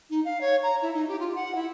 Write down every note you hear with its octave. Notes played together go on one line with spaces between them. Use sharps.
D#4
F5
C#5
A#5
E4
D#4
G4
F4
F#5
E4